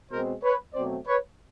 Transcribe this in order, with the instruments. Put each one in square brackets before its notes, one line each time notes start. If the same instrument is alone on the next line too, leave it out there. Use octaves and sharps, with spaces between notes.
[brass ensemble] B2 G#3 C4 A#4 C5
B4 C#5
B2 F#3 A3 C4 C5 D5
B4 C#5